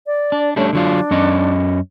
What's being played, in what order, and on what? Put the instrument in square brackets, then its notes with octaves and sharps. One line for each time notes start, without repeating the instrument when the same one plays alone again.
[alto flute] D5
[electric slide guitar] D4
[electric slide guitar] G3 A3 D4 [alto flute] C#4
[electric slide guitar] D3 F#3 F4 [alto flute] D4
[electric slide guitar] F#2 C#4 D#5